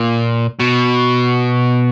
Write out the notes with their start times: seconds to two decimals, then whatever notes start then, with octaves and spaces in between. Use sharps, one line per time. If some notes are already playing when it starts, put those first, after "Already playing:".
Already playing: A#2
0.59 B2